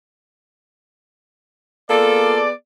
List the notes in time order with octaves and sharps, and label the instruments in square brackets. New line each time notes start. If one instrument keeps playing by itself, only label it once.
[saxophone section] A#3 F4 A4 [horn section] B3 G#4 D5